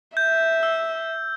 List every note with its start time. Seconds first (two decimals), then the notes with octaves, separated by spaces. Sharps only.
0.17 E5 G6
0.63 E6